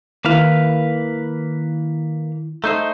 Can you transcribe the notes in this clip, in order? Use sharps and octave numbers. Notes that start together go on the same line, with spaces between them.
D#3 A#3 E4 B4 F5
A3 D#4 C5 A#5 G6